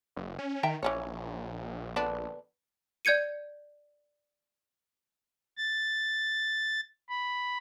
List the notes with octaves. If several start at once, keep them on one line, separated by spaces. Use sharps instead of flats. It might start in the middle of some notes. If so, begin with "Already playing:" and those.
F#1
C#4
D#3 E5 G5 A#5
A#1 E3 C#4 C#5
D3 B3 D4
D5 G6 G#6 C#7 D#7
A6
B5